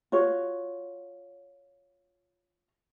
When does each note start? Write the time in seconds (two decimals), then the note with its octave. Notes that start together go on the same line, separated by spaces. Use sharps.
0.12 F4 F#4 C#5